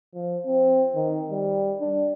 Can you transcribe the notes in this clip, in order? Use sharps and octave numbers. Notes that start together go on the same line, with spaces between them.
F3
C4
D#3
G3
D4